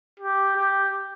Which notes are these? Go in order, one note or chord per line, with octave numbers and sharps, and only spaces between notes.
G4
G4